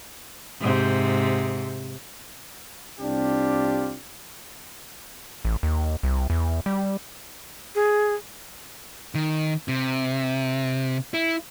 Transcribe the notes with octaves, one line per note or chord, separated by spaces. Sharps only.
G#2 C3
C2 C4 D4 F4 G4
A1
D#2
C2
E2
G3
G#4
D#3
C3
E4